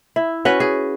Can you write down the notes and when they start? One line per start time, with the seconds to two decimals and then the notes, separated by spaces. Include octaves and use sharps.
0.16 E4
0.45 C#4 F#4 B4 F#5
0.60 G#4